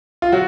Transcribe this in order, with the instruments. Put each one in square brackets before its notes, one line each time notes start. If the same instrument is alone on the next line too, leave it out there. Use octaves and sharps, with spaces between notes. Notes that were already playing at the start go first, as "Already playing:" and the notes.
[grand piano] F4
F#3 F#4